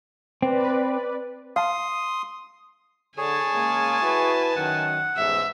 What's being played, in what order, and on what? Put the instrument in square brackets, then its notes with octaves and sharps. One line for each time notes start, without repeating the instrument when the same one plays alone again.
[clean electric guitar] C4 [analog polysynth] B4 D5
[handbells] F5 A5 [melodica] C6 D#6
[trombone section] D3 [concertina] G#4 C#5 [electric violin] G#5 A5
[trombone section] C#3 G#3 A#3
E4 F#4 B4
[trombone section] F#2 D#3 [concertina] F#5
[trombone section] A1 E2 G#2 [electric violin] E5